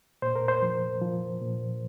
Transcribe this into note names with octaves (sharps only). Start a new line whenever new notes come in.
A#2 C5
A#4
C5
F3
F3
A#2